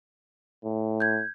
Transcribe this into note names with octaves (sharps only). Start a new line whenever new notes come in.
A2
G6 G#6